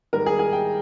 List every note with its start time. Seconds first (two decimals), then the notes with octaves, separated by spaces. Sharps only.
0.13 G#2 D#3 G3 A#4
0.26 G#4
0.39 G#4
0.53 G5